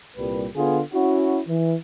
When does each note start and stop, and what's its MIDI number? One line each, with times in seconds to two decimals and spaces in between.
0.17 0.46 36
0.17 0.46 46
0.17 0.46 55
0.17 0.46 71
0.56 0.80 50
0.56 0.80 59
0.56 0.80 65
0.56 0.80 68
0.93 1.40 61
0.93 1.40 64
0.93 1.40 66
1.47 1.74 52